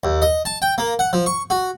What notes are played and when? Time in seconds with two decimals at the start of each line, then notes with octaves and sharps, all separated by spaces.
0.04 D#2
0.22 D#5
0.45 A5
0.62 G5
0.78 A#3
0.99 F#5
1.13 F3
1.26 C#6
1.50 F#4